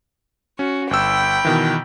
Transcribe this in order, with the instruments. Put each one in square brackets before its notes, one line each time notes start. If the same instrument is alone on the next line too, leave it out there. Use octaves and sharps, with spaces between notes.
[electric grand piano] C#4 [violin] F#4
[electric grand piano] G1 E6 [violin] G5 B5
[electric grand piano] B2 D#3 E3